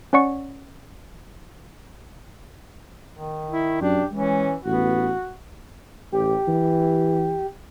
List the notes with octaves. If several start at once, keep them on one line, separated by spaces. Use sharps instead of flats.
C#4 C#5 D5 F#5 C#6 C#7
D#3
E4
F#2 D4 G4
E3 G#3 C#4
A1 B3 F#4
A1 G4
E3